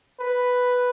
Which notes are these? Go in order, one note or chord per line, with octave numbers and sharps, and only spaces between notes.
B4